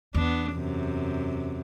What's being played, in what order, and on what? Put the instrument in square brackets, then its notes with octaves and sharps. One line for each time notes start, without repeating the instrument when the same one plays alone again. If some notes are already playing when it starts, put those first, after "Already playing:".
[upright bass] E2 [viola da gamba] B3 D4
[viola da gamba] F#2 C3